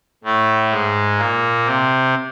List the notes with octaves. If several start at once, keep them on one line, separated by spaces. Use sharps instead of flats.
A2 A3
G#2 G#3
A#2 A#3
C3 C4